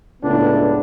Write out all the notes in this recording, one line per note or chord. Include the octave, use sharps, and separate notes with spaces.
C#2 A2 B3 D4